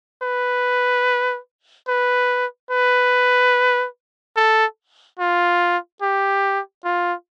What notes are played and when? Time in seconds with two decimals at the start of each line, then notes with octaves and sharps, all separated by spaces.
0.23 B4
1.88 B4
2.71 B4
4.37 A4
5.19 F4
6.02 G4
6.85 F4